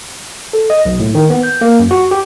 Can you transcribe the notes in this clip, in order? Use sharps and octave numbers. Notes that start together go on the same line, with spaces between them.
A4
D#5
B1
A2
D#3
B3
G6
A#3
F#2
F#4
G4